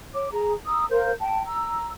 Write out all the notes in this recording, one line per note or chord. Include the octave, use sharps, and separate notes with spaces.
C#5 D6
G#4 A#5
A#5 D#6 E6
A#4 C5 F5 G6
G5 A5
A#5 E6